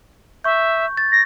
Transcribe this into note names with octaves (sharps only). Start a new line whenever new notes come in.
E5 C#6 G6
A6
A#6